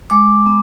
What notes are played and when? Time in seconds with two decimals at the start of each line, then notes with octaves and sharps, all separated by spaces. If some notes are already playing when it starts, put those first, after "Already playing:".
0.10 G#3 D6
0.46 B3